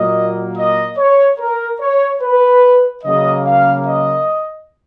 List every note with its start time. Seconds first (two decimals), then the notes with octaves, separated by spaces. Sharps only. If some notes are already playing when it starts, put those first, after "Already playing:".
Already playing: A#2 F#3 A#3 D#5
0.56 D#5
0.97 C#5
1.39 A#4
1.80 C#5
2.22 B4
3.04 C#3 F#3 A#3 D#5
3.46 F5
3.87 D#5